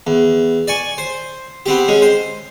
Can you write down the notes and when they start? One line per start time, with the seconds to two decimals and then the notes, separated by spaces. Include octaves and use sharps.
0.07 E2
0.68 D5 G#5 C#6
0.98 C5
1.66 B3 C4 G4
1.88 G#3 C#4
2.02 C5